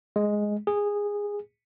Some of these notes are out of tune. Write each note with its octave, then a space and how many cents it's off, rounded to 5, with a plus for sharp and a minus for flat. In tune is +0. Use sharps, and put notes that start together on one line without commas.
G#3 +5
G#4 -15